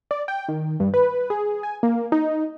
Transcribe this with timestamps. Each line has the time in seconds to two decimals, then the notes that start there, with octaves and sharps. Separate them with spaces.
0.11 D5
0.28 G5
0.48 D#3
0.80 G2
0.94 B4
1.30 G#4
1.63 G#5
1.83 A#3
2.12 D#4